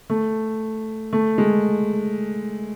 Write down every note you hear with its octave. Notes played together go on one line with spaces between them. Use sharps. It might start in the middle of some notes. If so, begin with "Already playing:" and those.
A3
A3
G#3